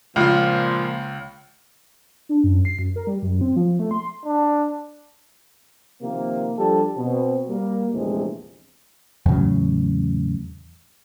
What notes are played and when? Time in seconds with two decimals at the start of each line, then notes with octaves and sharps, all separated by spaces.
0.16 C#2 A#2 F3 F4
2.29 D4
2.44 F#2
2.65 C7
2.79 F#2
2.96 A#4
3.07 G3
3.22 F#2
3.41 C4
3.56 F3
3.79 A3
3.91 C6
4.25 D4
6.02 C3 D#3 F3 A#3
6.58 F3 G3 D4 G4 A4
6.97 B2 C4
7.49 G3 A#3
7.93 A#1 E2 C3 G#3 A3
9.26 E2 A2 C#3 F#3